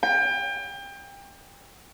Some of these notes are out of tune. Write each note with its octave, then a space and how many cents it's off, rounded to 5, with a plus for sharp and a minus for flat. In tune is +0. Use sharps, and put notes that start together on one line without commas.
G5 +30